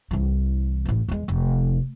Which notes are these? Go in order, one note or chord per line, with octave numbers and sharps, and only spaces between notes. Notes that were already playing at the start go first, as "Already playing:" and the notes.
C2 E3
A1 E3
E2 G#3
F1